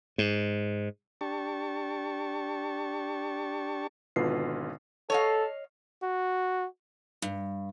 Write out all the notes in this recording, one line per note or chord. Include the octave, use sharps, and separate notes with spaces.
G#2
D4 G4 A5 C#6
G#1 B2 D3 F4 B4 C7
A4 C#5 D#5 F5
F#4
G2